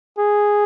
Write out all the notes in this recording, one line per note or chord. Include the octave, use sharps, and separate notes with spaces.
G#4